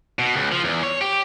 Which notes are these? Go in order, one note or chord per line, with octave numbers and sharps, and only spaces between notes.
B2
C#2
F3
E2
C#5
G4